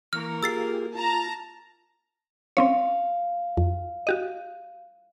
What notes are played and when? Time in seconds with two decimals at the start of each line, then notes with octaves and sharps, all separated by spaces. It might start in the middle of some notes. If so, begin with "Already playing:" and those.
0.13 E3 A#3 A#4 A#5 C#6 F6
0.43 F4 G4 G#4 E6 A6 C7
0.95 F4 A5 A#5
2.57 C4 C#4 C#5 F5
3.57 F2
4.07 F#4 G4 D#5